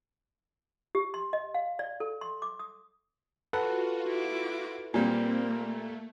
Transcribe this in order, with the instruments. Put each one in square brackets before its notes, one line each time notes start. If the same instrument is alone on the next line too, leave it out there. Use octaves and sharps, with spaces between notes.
[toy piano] G4
C6
D#5
F5
D5
A4
C6
D6
D#6
[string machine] F4 F#4 [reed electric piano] A4 B4 [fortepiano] F#5
[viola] E4 D6
[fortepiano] A#2 G3 [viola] A#3 [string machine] C4
[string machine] A3